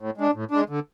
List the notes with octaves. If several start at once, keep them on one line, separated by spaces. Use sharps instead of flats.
A2
G#3 D4
A2
G#3 D4
D3